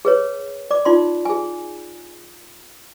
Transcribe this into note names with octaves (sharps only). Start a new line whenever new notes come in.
G#4 B4 C#5
D5 D6
D#4 F4 D5 C6
G#4 G#5